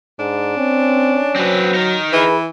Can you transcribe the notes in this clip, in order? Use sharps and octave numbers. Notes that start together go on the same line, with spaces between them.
G#2 D4
C4 C#4
F#3 C4 B4
D#4 A#4
E3 G#4 B4